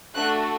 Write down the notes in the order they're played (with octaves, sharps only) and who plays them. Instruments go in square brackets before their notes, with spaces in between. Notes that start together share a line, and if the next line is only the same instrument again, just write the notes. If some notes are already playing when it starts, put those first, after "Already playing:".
[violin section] A3 D4 F#4 F#6